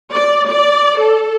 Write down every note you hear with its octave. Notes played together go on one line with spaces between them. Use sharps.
D5
D5
A4